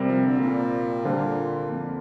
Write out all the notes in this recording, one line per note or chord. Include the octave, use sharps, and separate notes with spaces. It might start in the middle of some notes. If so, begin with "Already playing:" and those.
Already playing: C3 G3 C4 A#4
F3
D3
A#2
D3 G3 A#3 F4 C5
F2